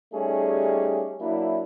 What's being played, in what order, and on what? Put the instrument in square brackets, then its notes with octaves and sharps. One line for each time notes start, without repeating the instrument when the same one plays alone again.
[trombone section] G3 A3 C#4 D#4 G4 G#4
F#3 A#3 D4 E4